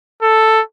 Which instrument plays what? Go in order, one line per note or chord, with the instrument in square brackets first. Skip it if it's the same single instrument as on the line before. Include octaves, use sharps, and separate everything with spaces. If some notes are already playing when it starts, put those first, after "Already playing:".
[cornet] A4